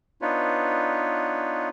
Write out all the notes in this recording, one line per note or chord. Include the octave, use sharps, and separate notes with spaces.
B3 D4 D#4 F4 B4 C#5